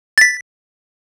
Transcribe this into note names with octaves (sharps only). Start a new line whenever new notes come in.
A6 B6